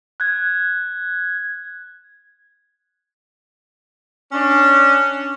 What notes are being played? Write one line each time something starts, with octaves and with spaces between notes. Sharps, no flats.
F#6 G#6
C#4 D4